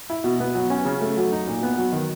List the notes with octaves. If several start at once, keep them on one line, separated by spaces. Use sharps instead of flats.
E4
B2
B3
F#3
C#4
C#3
A3
F#3
D#4
A#2
B3
F#3
D#3